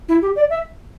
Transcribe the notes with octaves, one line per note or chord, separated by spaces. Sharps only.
E4
G4
D5
E5